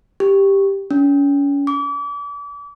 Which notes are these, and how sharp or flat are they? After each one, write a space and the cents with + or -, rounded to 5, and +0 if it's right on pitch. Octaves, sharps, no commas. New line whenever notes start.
G4 +5
C#4 +30
D6 -35